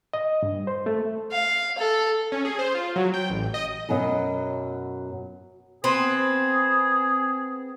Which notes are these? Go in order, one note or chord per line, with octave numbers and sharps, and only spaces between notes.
D#5
G2
C5
A3
F5
A4
C#4
G#4
C5
F4
F#3
G5
A1
D#5
F#2 B2 F#3 B3 D#5
B3 C4 G#4 B4